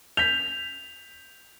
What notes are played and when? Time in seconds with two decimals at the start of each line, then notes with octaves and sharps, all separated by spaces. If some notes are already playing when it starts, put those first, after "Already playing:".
0.17 G6 B6 F7